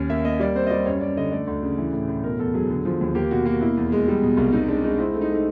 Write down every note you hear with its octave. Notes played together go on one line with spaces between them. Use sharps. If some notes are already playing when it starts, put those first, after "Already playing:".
Already playing: D#2 C#4
A#3 E5
A#3 D#5
G3 D5
C4 C5
D#5
G3 D5
F#2 C#5
F#2 D5
D3 D#5
A3 D5
D2
C#3
E3
A2
A2
B2 A#4
E2 A4
F#3 G#4
D3
F3
D#2
A#3 G4
B2 F#4
A#3 F#4
B2 E4
E2
G#3
G3
B2
C2
C3 D#4
G#3 D4
G#3 D#4
C4 E4
A3
D#4
A3
D#4